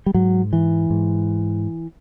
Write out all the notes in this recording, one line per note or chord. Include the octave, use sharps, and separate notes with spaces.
G3
G#2 F#3
E3
G#2